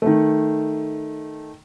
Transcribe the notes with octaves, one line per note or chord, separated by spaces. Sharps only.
D#3 A3